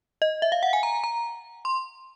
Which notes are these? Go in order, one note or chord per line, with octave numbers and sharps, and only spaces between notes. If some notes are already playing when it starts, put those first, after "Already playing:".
D#5
E5
F5
F#5
G#5
A#5
A#5
C6